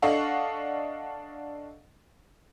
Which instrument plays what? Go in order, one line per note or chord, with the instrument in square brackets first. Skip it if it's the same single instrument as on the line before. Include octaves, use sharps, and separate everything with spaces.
[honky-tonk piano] D4 A4 D#5 F5 F#5 C#6